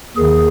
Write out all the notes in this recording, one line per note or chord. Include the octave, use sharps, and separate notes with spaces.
D#2 D#3 G#4